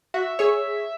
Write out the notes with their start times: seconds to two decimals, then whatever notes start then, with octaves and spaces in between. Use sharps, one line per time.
0.14 F#4 E5
0.39 G#4 C#5